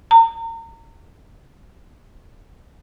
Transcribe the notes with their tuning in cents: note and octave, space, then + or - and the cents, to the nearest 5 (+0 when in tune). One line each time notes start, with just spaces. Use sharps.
A#5 -35